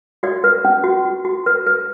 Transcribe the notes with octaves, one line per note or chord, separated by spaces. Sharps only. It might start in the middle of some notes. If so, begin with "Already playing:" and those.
F#4 D5
B4
C#4
F#4
F#4
F#4
B4
B4